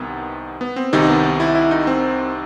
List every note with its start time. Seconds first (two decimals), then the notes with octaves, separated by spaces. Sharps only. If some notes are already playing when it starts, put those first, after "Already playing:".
Already playing: C2 C3 D#3 B3
0.61 B3
0.76 C4
0.93 C2 C3 D#3 D#4
1.09 B3
1.40 E4
1.55 E4
1.71 D#4
1.87 C4